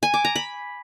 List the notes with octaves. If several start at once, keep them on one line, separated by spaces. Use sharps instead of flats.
G#5
D6
A#5
B5